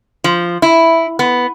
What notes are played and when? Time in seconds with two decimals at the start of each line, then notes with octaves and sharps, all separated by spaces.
0.24 F3
0.62 E4
1.19 B3